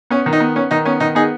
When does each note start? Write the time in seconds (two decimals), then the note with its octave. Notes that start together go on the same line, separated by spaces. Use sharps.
0.10 B3 C#4
0.26 D#3
0.33 D#4
0.40 B3
0.56 B3 C#4
0.71 D#3 D#4
0.85 B3 C#4
1.00 D#3 D#4
1.15 B3 D#4 G#4